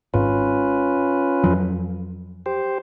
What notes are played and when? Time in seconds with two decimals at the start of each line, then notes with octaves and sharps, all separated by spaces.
0.14 G#1 G#2 C#4 F4 B4
1.44 F2 F3 F#3
2.46 G4 C5